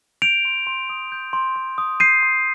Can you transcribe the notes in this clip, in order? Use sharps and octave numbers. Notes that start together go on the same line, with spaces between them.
G6 D7 F7
C6
C6
D#6
G6
C6
C6
D#6
G6 C7 D#7
C6